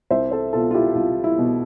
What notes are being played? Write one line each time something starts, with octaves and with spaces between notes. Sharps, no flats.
C2 C5 E5
A4 C5
B2 B3 F4 A4
F4
E4 G4
C2 F4
E4
B2 B3